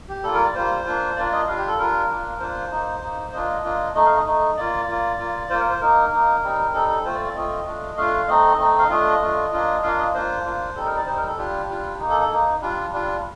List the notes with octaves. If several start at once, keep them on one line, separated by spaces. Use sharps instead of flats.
G4
G3 A#3 F4 A4
A#4
D5
G3 A#3 F4 C5
A#3 D4 F4
A#3 D4 F4 D5
D#5
G3 D4 F4 F5
G4
A4
G3 D4 F4 A#4
A#3 D4 F4
A#3 D4 F4 C5
A#3 D#4
A#3 D#4
A#3 D4 F4 D#5
A#3 D4 F4
A3 D#4 D#5
F5
D#5
A3 D#4
A#3 F4 D5
A#3 F4
A#3 F4
A#3 F4 C5
A#4
C5
A#3 D#4 A#4
A#3 D#4
G3 C4 D#4
G3 C4 D#4 A4
A4
A3 C4 F4 C5
D5
D5
A3 C4 F4 D#5
A3 D4 F4
A3 D4 F4 F5
A3 C4 D#4 D#5
A3 C4 D#4
F5
A3 D4 F4 D#5
A3 D4 F4
A#3 D4 F4
A#3 D4 F4 F5
D#5
A#3 D4 F4 C5
A#3 D4 F4
G3 C4 D#4 A4
A#4
D5
G3 C4 D#4 C5
A#4
A4
G3 D4 F4 G4
G3 D4 F4
A#3 D#4
A4
A4
A#3 D#4
G3 D4 F4
G3 D4 F4